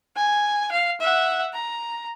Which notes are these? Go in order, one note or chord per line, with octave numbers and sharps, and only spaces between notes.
G#5
F5
E5 F#5
A#5